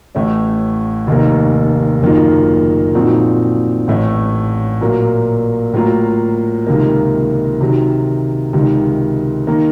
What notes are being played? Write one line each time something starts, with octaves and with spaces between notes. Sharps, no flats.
A1 A2 A3 C#4
F1 D#2 D#3 A#3
F#1 F#2 D#3 A#3 F4
A#2 F3 C4 D#4 F#4
A1 A2 A3 C#4
A#2 F#3 A#3
A2 F#3 A#3 F4 A#4
C#2 C3 D#3 A#3
C3 D#3 F#3
C#2 C3 D#3
D#3 A#3